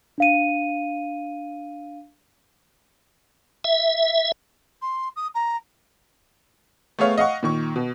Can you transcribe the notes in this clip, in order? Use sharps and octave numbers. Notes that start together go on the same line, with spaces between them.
D4 F5 D#7
E5
C6
D#6
A#5
A3 B3 G#4 C#5 F5
D#5 F5 F#5 C#6
A#2 D#3 C#6
B2